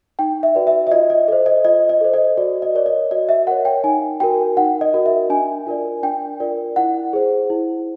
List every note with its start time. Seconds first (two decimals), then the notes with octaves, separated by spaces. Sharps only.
0.19 D#4 G5
0.43 E5
0.55 F#4 B4 D5
0.67 E5
0.87 E5
0.92 F4 D#5
1.10 D#5
1.28 A4 C5 D#5
1.46 D#5
1.65 F4 D#5
1.89 D#5
2.01 A4 C5
2.14 D#5
2.37 F#4 D5
2.62 D#5
2.75 A#4 C#5 D5
2.86 D#5
3.11 F#4 D#5
3.29 E5
3.47 A#4 C#5 F#5
3.65 G5
3.84 D#4 G#5
4.20 F#4 A#4 G5
4.57 D#4 F#5
4.81 D#5
4.94 F#4 A#4
5.06 E5
5.30 D4 G#5
5.66 F4 A#4 D5
6.03 D4 G5
6.40 F4 A#4 D5
6.76 E4 F#5
7.13 G#4 C5
7.50 E4